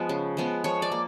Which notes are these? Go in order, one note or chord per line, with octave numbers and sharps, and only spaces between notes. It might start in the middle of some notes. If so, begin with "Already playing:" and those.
Already playing: F3 G#3 B3
C#3
F3 G#3 B3
F3 C#5
D5
A#3